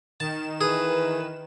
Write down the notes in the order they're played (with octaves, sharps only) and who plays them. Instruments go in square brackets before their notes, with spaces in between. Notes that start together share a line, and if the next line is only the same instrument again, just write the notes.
[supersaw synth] D#3 E7 [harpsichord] A5
[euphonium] E3 [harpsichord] G#4 [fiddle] B4